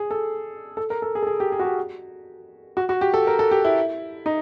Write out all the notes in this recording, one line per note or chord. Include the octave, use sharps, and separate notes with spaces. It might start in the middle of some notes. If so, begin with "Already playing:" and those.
Already playing: G#4
A4
A4
A#4
A4
G#4
A4
G#4
G4
G#4
F#4
G4
F#4
F#4
G4
A4
A#4
A4
G4
E4
D#4